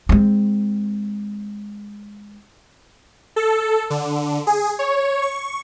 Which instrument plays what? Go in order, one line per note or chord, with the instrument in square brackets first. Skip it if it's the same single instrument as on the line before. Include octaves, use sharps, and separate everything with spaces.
[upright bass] G#3 C4
[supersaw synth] A4
D3
G#4
C#5
C#6